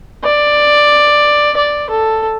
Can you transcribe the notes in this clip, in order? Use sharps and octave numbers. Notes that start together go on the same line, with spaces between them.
D5
D5
A4